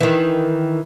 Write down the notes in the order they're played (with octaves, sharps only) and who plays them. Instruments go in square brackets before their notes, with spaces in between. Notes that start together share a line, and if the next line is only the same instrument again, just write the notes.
[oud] D#3 E3